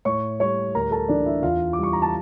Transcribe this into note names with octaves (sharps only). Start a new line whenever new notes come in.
A2 C#5 C#6
G3 C#5 C#6
D2 A#4 A#5
A4 A5
E3 D4 D5
E4 E5
E2 F4 F5
D6
G3
C#6
A#5
A5